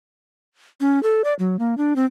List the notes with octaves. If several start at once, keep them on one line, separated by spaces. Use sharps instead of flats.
C#4
A4
D5
F#3
A#3
D4
C4